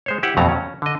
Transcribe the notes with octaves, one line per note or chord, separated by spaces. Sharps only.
G#3 C5 C#5
E4 G4 E5 F#5
F2 B2 F#3 A3 A5 A#5
C#4
D3 D#5